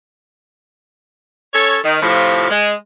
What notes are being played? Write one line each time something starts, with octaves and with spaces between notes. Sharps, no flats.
C#4 A4 C#5
D#3
A2 C3 F3
G#3